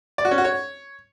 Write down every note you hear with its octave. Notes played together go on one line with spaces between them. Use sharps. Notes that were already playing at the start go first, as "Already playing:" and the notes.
D5
F#4
C#4
F#4
C#5